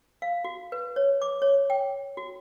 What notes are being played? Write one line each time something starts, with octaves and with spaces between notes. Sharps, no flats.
F5
F#4
B4
C#5
D6
C#5
G5
F#4